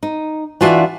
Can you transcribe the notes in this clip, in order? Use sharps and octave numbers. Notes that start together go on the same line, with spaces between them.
D#4
E3 D4 F4 F#4 D5 E5